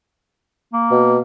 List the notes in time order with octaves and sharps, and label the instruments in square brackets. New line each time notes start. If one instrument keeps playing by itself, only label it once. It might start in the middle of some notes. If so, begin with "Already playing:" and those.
[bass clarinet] A#3
[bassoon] B2